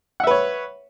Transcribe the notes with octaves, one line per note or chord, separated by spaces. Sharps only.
B4 C#5 E5 F#5